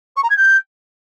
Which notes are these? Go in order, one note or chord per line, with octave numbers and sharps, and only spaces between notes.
C#6
A#5
G#6
G6